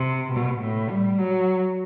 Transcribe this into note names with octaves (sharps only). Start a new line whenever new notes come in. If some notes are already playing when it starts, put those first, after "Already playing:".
Already playing: C3
B2
A2
G3
F#3